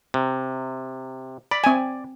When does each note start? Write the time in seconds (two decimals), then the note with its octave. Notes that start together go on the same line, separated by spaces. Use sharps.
0.14 C3
1.51 D5 B5
1.64 C4 G#5